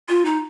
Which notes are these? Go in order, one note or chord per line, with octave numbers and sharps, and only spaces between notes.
F4
D#4